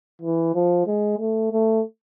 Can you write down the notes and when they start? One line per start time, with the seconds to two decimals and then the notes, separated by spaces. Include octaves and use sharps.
0.22 E3
0.54 F3
0.87 G#3
1.19 A3
1.52 A3